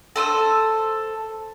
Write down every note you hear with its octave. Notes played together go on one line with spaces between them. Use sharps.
A4 C5 D#6 E6